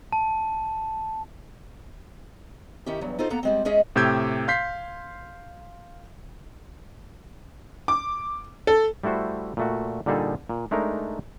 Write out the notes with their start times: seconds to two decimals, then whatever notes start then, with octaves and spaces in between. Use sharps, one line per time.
0.13 A5
2.86 D#3 C#4 E4 G4
3.01 E2 G2 F#3
3.19 D#4 F4 F#4 A4 C5
3.30 A#3 B3 A4 F#5 A#5
3.43 G3 G#3 C4
3.65 G#3 C#4 G#4 D#5 E5
3.96 A2 C3 G4 E6 G6 G#6
4.48 F5 C6 G6 B6 C7
7.88 D6
8.67 A4
9.04 G3 A3 E4 F#4 C5
9.57 A#2 A3 F#4
10.06 A#2 D3 G3 D#4 G#4 A4
10.50 A#2
10.71 G#3 A3 D4 D#4 A#4